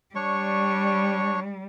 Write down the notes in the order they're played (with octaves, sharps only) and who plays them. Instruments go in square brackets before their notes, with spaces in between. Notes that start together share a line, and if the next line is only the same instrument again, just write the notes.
[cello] G3 [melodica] D4 C#5 C#6